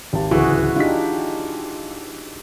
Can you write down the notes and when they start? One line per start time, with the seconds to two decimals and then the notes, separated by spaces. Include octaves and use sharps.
0.13 G#1 G4 A5
0.31 D1 C#2 E3 F#4 G#4
0.76 D4 D#4 F4 G4 B6